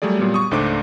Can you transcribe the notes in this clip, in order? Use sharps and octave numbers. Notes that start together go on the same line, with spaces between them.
F#3 G3 A3 G#4 D5
A#2 F#3 G3 B3
C#6 D#6
C#2 G#2 A3 D4 C5 D6